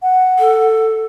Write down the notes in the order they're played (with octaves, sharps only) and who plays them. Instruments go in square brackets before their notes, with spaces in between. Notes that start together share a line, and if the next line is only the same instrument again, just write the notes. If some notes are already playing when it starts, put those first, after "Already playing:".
[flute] F#5
[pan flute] A4